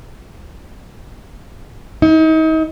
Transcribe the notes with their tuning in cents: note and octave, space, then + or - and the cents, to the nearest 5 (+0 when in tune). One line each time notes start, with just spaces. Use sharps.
D#4 +35